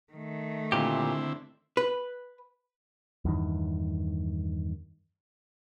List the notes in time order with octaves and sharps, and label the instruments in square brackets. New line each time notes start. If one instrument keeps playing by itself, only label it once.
[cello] D#3 A3
[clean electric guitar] A#2 G4 [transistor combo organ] D3 C4 E4
[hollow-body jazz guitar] B4
[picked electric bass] E2 G2 D#3